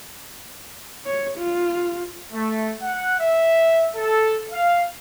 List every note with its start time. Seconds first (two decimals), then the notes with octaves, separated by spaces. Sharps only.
1.06 C#5
1.38 F4
2.33 A3
2.82 F#5
3.19 E5
3.95 A4
4.52 F5